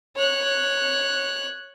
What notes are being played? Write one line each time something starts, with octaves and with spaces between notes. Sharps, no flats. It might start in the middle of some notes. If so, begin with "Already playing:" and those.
C#5 F#6